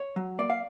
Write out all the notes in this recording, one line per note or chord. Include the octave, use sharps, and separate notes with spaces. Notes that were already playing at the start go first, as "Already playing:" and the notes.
Already playing: C#5
F#3
A#3 D5
F5